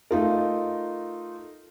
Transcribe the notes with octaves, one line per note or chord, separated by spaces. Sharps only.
A3 D#4 F4 A#4